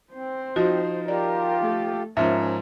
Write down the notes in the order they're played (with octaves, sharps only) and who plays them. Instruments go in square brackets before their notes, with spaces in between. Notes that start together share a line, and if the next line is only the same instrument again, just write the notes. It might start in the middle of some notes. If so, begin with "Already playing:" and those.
[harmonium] C4 [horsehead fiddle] C5
[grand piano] F3 D#4 [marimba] F#4
[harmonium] F4 G4 [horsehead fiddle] A#4 [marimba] D5
[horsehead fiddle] A3 A4
[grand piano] G#2 F3 [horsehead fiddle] C#4 A#4 [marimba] E5